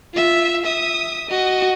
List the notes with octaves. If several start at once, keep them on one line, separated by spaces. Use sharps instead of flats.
F4 E5
E5 D#6
F#4 D#5